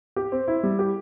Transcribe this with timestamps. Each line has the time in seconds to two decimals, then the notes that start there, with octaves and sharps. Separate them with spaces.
0.16 G4
0.32 C4
0.48 E4
0.63 G3
0.79 G4